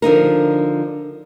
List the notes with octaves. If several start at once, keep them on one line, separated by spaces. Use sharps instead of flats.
D3 F3 D#4 A#4